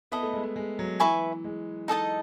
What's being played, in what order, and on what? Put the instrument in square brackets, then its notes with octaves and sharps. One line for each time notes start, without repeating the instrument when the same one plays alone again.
[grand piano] B3 [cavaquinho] E4 A4 D#5
[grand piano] A3
G#3
A3
G#3
F#3
[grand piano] E3 [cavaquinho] B4 E5 G#5 C#6
[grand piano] G#3
[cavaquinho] D#4 A4 D#5 A5